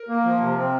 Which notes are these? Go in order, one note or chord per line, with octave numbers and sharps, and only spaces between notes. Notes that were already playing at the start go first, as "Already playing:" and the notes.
Already playing: A#4
A#3
F3
C3
C4